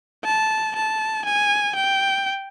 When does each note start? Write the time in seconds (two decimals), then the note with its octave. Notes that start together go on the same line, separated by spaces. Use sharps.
0.25 A5
0.75 A5
1.25 G#5
1.75 G5